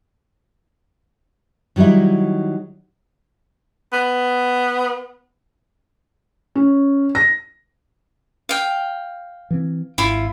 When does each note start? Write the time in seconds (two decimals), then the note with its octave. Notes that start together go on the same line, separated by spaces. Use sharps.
1.76 D#3 F#3 G3 D#4 E4
3.93 B3
6.55 C#4
7.15 A#6
8.49 F5 G5
9.51 E3 C4
9.98 G#1 E4 F4